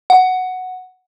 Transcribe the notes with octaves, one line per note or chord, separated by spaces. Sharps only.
F#5